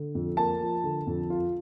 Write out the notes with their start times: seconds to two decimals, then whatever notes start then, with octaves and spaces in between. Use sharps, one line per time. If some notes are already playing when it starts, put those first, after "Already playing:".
Already playing: D3
0.15 F2
0.37 A#3 A5
0.61 F3
0.84 D3
1.07 F2
1.30 F4